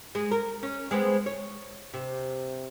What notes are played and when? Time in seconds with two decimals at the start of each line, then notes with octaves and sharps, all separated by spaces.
0.15 G#3
0.31 A#4
0.63 C#4
0.91 G#3 B3 C4
1.26 C#5
1.94 C3